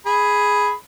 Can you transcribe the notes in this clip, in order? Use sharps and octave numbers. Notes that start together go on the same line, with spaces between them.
G#4 B5